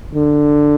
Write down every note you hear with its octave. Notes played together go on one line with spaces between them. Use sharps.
D3